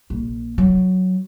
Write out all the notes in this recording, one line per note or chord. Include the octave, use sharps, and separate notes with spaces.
A#1
F#3